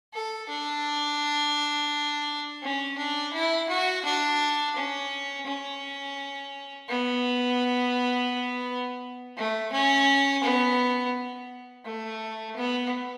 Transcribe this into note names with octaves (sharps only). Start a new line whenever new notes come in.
A4
D4
C#4
D4
E4
F#4
D4
C#4
C#4
B3
A3
C#4
B3
A3
B3